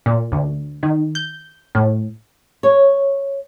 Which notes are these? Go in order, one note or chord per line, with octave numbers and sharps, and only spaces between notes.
A#2
D2
D#3
G6
A2
C#5